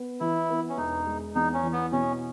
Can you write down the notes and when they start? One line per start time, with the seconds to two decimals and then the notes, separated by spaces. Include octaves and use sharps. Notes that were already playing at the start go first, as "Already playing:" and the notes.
Already playing: B3
0.20 E3 E4
0.50 B3
0.69 C#4
0.77 E1 D#4
1.06 G#3
1.35 E2 D#4
1.54 C#4
1.63 E3
1.73 B3
1.92 B2 C#4